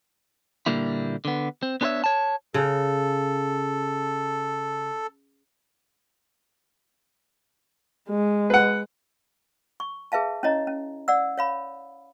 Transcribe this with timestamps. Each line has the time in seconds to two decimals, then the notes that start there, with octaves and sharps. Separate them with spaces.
0.66 A#2 D3 G3 A#3 E4
1.25 D3 B3
1.63 C4
1.81 B3 D4 G#4 B4 C#5 E5
2.04 C#5 A5
2.54 C#3 A4
8.09 G#3
8.50 B4 F#5
9.80 C#6
10.12 G#4 B4 E5 F5 A5
10.43 C#4 E4 C#5 D#5 A#5
10.67 C#4
11.08 D5 F#5 E6
11.38 C#5 F5 B5